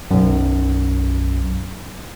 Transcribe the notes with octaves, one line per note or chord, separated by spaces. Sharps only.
B1 F#2